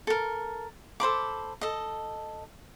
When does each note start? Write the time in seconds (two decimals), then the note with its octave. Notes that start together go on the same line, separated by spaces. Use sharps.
0.07 A4 A#4
1.00 A4 C5 B5 D6
1.61 A4 D#5